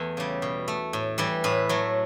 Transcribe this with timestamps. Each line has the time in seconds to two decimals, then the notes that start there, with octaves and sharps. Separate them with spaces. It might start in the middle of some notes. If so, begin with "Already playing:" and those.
Already playing: E2 E3 A3
0.17 C#3 G3
0.42 B2
0.68 A3
0.93 A2
1.18 E3 G3
1.44 A2 B4
1.69 F#3 A3